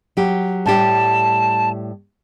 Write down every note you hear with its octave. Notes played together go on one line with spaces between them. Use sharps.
F#3 G4
A2 G3 G4 A5